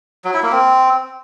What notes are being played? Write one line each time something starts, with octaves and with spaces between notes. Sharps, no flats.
F#3
E4
A#3
C4